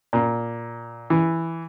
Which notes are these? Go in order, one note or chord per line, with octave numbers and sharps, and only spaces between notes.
A#2
E3